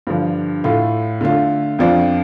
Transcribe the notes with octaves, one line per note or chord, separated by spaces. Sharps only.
G2 D3 F3
A2 A3 F4
D3 A3 F4
F2 F3 D4 F4